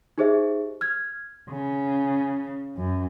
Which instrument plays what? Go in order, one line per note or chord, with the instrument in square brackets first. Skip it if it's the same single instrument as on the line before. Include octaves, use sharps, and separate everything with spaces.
[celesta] D#4 G4 G#4 C5 D#5 E5
F6 G#6
[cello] C#3
F#2